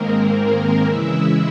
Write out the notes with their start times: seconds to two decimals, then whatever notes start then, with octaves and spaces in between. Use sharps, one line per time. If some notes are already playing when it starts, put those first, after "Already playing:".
Already playing: G#2 D#3 G#3 A#3 C4 A#4
0.84 C#3 E3 G#3 E4 E5